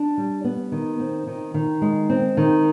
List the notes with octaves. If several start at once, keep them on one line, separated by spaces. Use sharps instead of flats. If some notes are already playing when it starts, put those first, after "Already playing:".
Already playing: D4
G3
B3
D#3
C4
D#3
D#3
G#3
C4
D#3